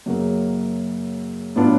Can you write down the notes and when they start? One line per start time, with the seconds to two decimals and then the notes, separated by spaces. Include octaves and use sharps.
0.06 F#2 C#3 F#3 A#3
1.56 A2 F#3 B3 D4 F4